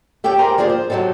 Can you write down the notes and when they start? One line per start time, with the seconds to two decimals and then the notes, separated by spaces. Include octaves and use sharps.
0.24 A3 G4 A4 C#5 G5
0.38 G4 G#4 A#4 C5 D5 A#5
0.58 F3 G3 A#3 G#4 C5
0.70 C5
0.90 C3 F3 F#3 D#4 A4